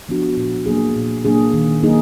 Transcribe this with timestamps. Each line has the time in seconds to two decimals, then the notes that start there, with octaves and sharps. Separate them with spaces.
0.09 F3 B3 D4 F#4
0.37 A#2
0.66 F#3 A#3 D4 G#4
0.96 A#2
1.25 F#3 A#3 D4 G#4
1.53 D#3
1.83 F#3 A#3 D#4 G#4